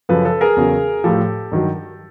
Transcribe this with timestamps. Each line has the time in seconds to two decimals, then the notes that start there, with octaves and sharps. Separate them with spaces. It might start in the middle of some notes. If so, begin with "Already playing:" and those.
0.09 F#2 C#3 F3 A4 B4
0.25 A4 B4
0.41 G#4 A#4
0.56 E2 C#3 F#3
1.04 A2 F3 G4 A4
1.52 G2 D#3 F#3